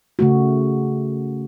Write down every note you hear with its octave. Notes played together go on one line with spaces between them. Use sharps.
C#3 A3 F#4